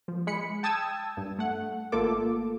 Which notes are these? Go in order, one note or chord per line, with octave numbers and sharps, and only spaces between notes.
F3
G#3 B5 C#7
G5 A5 D#6 E6 G#6
G2
A3 F#5
G#1 A3 A#3 F4 A4 D6